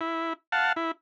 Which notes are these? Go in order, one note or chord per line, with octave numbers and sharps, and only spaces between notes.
E4
F5 F#5 A5
E4